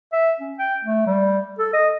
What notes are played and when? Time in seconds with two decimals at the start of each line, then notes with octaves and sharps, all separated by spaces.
0.13 E5
0.40 C#4
0.59 G5
0.84 A3
1.06 G3
1.59 A4
1.73 D#5